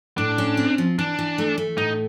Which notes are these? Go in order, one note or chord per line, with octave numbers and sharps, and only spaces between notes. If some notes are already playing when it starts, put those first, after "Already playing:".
A2 D4
C#4
C4
F3
E3 D4
E3
A3
A3
A2 D#4